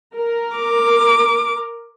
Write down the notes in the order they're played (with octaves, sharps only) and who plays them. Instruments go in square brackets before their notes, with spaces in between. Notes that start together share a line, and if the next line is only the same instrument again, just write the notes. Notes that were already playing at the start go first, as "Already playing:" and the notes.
[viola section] A#4
[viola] D6